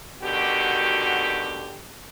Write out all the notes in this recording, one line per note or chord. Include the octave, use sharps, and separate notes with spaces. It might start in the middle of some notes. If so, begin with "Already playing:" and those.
B2 D3 D#3 F#4 G4